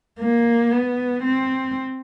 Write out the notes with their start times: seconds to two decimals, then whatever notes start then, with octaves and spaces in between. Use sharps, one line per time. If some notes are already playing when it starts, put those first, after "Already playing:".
0.20 A#3
0.71 B3
1.23 C4